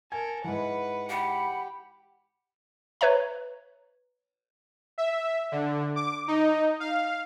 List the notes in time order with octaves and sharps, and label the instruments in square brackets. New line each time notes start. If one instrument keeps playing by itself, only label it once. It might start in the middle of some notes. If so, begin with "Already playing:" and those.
[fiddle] A4 A#4 [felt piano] G#5
[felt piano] G#2 E3 [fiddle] B4 F#5
[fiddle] G4 [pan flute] F#5 [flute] B5
[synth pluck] B4 C#5 E5 A#5
[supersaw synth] E5
D3
D6
D#4
F5